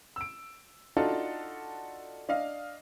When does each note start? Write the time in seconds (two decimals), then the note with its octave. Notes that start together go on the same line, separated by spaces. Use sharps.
0.16 E6 D7
0.97 D4 D#4 F4 F#4 A4
2.29 D4 D#5 F5